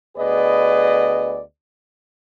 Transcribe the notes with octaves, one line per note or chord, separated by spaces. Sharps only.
D2 B3 G#4 B4 D5 D#5